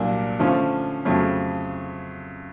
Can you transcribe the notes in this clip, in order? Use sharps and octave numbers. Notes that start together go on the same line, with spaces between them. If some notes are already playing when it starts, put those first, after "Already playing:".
Already playing: C2 A#2 F#3 A#3 D4
D3 F3 A3 C#4 F4
F2 C#3 F#3 A3